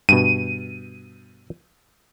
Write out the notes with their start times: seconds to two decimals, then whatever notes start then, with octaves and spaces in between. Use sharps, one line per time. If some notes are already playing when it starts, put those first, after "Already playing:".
0.09 G2 B2 D#7